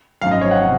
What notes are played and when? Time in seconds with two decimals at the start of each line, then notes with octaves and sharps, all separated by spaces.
0.21 G#1 F#2 F3 F5
0.31 D#5
0.41 C#5
0.51 F#5
0.62 C3